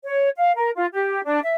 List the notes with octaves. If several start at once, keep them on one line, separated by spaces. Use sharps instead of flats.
C#5
F5
A#4
F4
G4
D4
E5